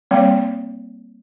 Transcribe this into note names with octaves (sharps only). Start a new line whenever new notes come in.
G3 A#3 C4 C#5